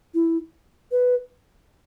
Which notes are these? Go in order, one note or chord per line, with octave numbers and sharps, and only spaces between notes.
E4
B4